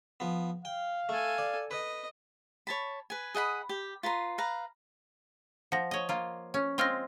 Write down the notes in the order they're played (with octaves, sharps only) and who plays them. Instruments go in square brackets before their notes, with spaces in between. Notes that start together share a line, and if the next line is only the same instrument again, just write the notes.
[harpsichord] F3 B3
[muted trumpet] F5 [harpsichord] G5
[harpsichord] A3 [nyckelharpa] A4 G#5
[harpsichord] D5
[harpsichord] B4 [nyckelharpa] D#5
[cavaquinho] C#5 A5 B5
B4 G#5
G#4 D#5 F#5 B5
G4
F4 B4 A#5 C6
B4 F5 A#5
[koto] F3 [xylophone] F#5 A#6
[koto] C#5 D#5
A#3 F4
C#4
[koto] G#3 C4 F4 [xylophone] C6 F6 A#6